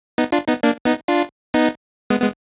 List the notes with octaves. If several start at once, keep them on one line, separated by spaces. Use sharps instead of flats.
B3 D#4
D4 F4
B3 D#4
A#3 D4
B3 D#4
D4 F4
B3 D#4
G#3 B3
G#3 B3